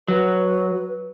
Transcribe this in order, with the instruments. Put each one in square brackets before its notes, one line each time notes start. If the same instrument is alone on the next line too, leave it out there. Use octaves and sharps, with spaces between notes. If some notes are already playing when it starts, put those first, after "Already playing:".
[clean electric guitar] F#3 [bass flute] B4